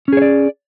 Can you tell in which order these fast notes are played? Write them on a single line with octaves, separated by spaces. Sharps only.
C#4 G#4 C#5 D5